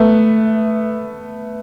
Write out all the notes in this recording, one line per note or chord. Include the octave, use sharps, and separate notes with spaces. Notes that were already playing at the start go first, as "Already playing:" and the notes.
Already playing: A3 B3